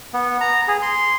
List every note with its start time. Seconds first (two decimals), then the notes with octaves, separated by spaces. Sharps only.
0.14 B3
0.41 A#5
0.68 G#4
0.82 C6